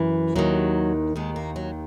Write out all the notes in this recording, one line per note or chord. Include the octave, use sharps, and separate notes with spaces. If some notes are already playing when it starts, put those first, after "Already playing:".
Already playing: F#2 E3
D#2 D#3 F#3
D#2 D#3 G#3
A#3
F#3